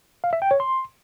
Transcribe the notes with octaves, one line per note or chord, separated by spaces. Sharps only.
F5
E5
G5
C#5
C6